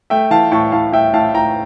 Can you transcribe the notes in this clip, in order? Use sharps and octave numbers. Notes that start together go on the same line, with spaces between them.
A3 E5 G5
E3 F5 A5
A2 A5 C#6
A2 F5 A5
A2 E5 G5
A2 F5 A5
A2 G5 A#5